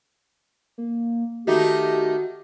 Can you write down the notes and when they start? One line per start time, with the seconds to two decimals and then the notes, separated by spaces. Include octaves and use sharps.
0.78 A#3
1.47 D#3 A3 D#4 F#4 G4